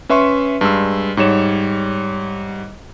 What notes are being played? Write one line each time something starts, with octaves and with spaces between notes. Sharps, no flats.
C#4 B4 E5 C6 C#6
G2 G#3 C6 E6
G#2 G3 C#5 E7